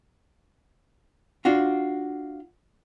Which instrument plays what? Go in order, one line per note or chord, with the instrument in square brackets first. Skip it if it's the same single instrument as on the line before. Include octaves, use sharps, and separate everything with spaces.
[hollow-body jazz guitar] D4 F4 F#4